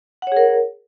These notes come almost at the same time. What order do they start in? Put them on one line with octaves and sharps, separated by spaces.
F#5 C#5 G#4 A#4